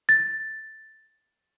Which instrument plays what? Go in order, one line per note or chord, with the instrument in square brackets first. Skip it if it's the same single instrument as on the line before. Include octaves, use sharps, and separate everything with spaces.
[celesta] A6